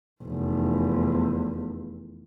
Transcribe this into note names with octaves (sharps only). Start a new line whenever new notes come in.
F1 E2